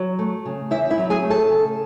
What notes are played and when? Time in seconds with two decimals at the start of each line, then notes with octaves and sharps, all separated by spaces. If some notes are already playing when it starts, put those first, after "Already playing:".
Already playing: F#3
0.19 A3
0.45 C#3
0.71 E2 E4 E5
0.90 E4 E5
0.97 F#3
1.10 G#4 G#5
1.24 A3
1.30 A4 A5
1.50 C#3